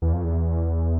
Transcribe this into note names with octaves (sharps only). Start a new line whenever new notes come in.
E2
F2
E2